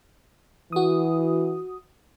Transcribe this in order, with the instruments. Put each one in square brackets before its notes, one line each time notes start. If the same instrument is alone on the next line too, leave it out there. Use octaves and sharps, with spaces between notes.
[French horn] E3 [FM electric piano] F#4 D#6